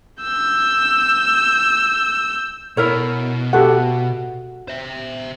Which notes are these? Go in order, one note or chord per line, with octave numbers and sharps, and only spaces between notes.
E6 G6
B2 E4 A#4 C#5
F#4 G4 A4 F#5
C5 E5